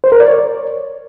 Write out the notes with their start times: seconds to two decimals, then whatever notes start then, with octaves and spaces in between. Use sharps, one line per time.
0.04 C5
0.12 A#4
0.20 D5
0.28 C#5